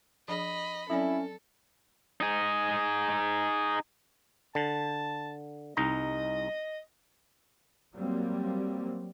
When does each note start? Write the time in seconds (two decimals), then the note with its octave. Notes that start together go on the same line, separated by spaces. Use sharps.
0.28 F3 D4 G#4 D#5 B5
0.90 F#3 C4 C#4 E4 A4 D5
2.21 D#4 G#4
4.55 D3 A5
5.77 C2 D#4 D#5 A#5
7.94 F#3 G3 A#3 C4